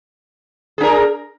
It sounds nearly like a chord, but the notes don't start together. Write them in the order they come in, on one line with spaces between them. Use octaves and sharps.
G#4 D4 A#4